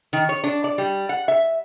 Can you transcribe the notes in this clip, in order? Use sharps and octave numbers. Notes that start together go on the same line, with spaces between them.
D#3
C#5
D4
D5
G3
F#5
E5